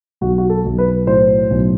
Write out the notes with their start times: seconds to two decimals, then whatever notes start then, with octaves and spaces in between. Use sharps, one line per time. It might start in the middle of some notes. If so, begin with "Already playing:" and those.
0.21 B1 F#4
0.38 F#4
0.50 A4
0.65 B1
0.78 B4
1.07 A2 C5
1.50 B1